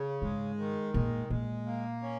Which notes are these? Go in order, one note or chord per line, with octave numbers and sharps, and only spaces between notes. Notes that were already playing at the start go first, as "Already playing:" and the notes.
Already playing: C#3
G#2 G#3
D#3
A#2 G#3
A#2 G#3
A#3
C#4